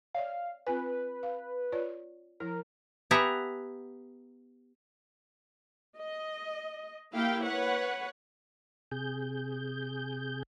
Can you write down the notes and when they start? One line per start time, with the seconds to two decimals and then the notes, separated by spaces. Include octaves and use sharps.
0.15 C#5 D5 E5 F5
0.67 C4 F4 B4 G#5
1.23 F5
1.72 F4 C#5 D5
2.40 F3 E4 A#4
3.11 B3 G4 E5 F#5 G#5 A#5
5.98 D#5
7.14 A#3 E4 G4 F5 G5
7.44 B4 C#5 F#5
8.91 C3 G#4 G6